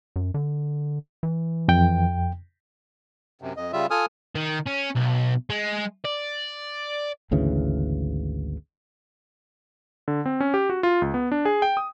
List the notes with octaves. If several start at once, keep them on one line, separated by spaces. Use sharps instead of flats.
F#2
D3
E3
F2 G5
F#2 C3
F2 D#5
C#3 G3 F4 E5
F4 A4 G#5 D#6 F6
D#3
C#4
B1
G#3
D5
G#1 D2 C#3 E3
D3
C4
C#4
G4
F#4
F4
C#2
B3
D4
G#4
G5
D#6